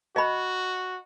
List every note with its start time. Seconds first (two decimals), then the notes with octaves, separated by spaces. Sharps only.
0.16 F#4 D#5 B5